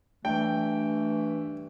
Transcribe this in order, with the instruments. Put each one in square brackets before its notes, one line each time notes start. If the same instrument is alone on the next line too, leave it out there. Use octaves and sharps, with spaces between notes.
[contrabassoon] G2 [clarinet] E3 [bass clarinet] A3 [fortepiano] G5